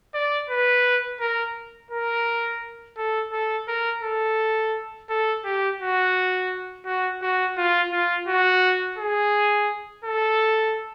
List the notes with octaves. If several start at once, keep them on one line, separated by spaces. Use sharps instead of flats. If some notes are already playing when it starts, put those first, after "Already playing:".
D5
B4
A#4
A#4
A4
A4
A#4
A4
A4
G4
F#4
F#4
F#4
F4
F4
F#4
G#4
A4